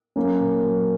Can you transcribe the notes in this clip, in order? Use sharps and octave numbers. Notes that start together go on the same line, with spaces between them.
F#3 A#3 C#4
A#2
F#3